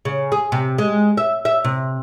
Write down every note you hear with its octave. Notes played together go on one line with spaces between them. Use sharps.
C#3
G#4
C3
G#3
E5
E5
C3